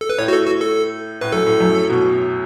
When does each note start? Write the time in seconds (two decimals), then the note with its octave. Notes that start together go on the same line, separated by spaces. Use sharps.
0.01 A4
0.10 B4
0.18 A2 C#5
0.28 F#4
0.33 A4
0.46 F#4
0.61 A4
1.21 A2 B4
1.32 F#2 A4
1.46 A2
1.60 F#2
1.90 B2